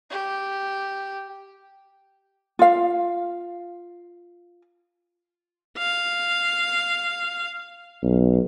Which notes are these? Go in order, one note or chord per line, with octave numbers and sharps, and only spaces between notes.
G4
F4 F5
F5
B1